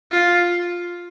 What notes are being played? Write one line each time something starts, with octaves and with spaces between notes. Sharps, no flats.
F4